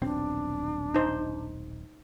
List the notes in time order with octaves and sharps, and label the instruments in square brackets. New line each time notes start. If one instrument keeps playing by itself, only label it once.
[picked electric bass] D#1 B1 C4 [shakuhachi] D4
[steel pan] D#4 C5